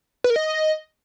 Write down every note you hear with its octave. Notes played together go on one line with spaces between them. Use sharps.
B4
A#4
D#5